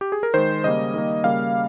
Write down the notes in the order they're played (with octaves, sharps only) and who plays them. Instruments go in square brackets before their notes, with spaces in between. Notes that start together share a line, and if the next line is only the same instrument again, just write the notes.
[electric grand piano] G4
G#4
A#4
D#3 G#3 C5
C#3 G3 A#3 D#5
D#3 G3 A#3
C#3 G3 A#3 F5